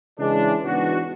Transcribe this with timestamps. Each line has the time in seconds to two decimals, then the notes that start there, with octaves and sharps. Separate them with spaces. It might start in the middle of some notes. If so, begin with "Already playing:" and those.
0.19 C#3 E3 G#3 D4
0.63 G#2 E3 B3 D4 F#4